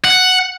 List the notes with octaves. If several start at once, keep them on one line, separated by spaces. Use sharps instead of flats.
F#5